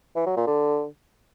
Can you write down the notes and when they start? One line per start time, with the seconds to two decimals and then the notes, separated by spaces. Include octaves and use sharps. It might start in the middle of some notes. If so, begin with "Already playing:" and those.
0.16 E3
0.26 F#3
0.36 A#2
0.47 D3